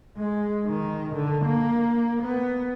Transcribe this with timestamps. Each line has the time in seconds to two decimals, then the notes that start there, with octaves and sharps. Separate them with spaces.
0.17 G#3
0.66 D#3
1.14 D3
1.45 A#3
2.22 B3